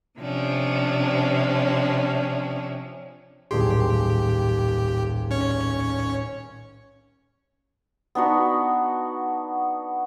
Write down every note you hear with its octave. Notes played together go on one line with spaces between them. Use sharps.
C3 F3 C#4 D4
D#1 B1 A2 G4 G#4 C6
C#4 C#5
B3 D4 D#4 F#4